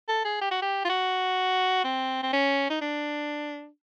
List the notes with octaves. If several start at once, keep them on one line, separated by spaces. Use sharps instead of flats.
A4
G#4
G4
F#4
G4
F4
F#4
C4
C4
C#4
D#4
D4